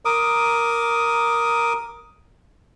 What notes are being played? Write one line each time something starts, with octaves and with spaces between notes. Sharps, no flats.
A#4 D6 D#6